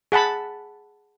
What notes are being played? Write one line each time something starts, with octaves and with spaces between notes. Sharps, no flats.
G#4 F#5 A5 B5